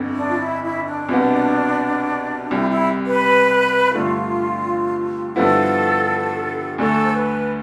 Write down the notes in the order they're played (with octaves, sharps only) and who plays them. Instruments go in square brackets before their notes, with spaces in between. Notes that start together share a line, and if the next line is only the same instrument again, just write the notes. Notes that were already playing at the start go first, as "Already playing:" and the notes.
Already playing: [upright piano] G1 F2 D3
[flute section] D4
F4
E4
E4
D4
[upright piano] C2 B2 B3
[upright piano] C2 C3 G3 [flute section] E4
[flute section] E4
B4
[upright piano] G2 D3 A3 [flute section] F4
[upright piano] G2 D3 F3 B3 E4 [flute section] A4
[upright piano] D2 D3 A3 [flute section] A4
[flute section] C5
B4